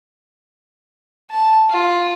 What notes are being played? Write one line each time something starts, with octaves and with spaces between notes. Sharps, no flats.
A5
F4